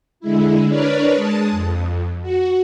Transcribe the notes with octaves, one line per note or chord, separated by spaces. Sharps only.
D3 G#3 E4
D4 A#4 B4 C#5 D5 F6
G#3 A5 D#6
F2
F#4